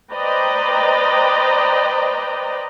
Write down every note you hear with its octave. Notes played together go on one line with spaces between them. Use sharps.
B4 C5 D5 D#5 G5 A#5